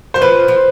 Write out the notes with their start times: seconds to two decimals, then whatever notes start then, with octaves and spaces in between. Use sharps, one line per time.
0.14 F#3 C5
0.21 F3 B4
0.48 F3